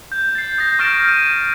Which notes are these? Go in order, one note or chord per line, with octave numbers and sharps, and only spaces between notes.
G6
A6 C7
D#6 G6 A#6
C#6 F6 A6 A#6 D7 E7
D#7